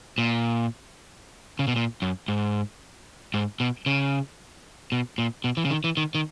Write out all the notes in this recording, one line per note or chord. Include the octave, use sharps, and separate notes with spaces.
A#2
C#3
B2
A#2
F#2
G#2
G#2
B2
C#3
B2
A#2
B2
E3
C#3
D#3
E3
D#3
D#3